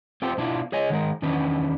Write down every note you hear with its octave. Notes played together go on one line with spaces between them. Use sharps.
C4 F4 G4 A4 C5
B2 D4 E4 F4
G#4 C#5 D#5 G#5
D#3 G#3 A#4
E2 D#3 C#4 D4 B4